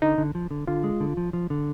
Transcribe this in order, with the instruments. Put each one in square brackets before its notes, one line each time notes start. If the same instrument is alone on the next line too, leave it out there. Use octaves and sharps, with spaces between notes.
[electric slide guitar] D3 [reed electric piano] D#4
[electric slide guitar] D3
F3
D3
[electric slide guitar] D3 [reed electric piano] F4
[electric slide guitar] G#3
D3
F3
F3
D3